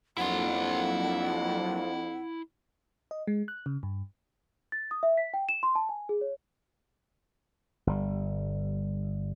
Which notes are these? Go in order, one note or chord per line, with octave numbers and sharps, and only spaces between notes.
F2 F#3 A#3 D4 E4 F#5 C6
D#5
G#3
F#6
C#3
G2
A6
D#6
E5
B6
G5
E7
C6
A5
G#5
G#4
C#5
G1 G3